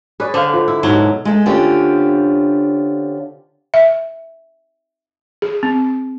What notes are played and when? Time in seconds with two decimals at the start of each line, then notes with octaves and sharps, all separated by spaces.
0.20 G#4 B4 C#5 D5
0.34 D3 C5 F5
0.54 F4 C5 D#5
0.68 E4
0.83 G#2 B2 F#3
1.25 G#3 A3
1.46 D3 C4 C#4 F4 G4
3.74 E5
5.42 G#4
5.63 C4